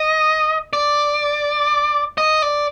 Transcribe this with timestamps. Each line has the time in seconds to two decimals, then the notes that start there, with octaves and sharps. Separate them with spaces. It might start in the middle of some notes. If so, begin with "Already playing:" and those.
Already playing: D#5
0.73 D5
2.18 D#5
2.42 D5